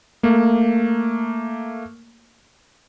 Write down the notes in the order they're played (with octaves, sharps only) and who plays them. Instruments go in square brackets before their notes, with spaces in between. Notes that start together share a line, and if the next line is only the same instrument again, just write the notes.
[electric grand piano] A3 A#3